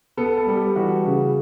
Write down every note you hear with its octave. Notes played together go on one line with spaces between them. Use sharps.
B3 A4
A4
G3
G4
E3 F#4
C#3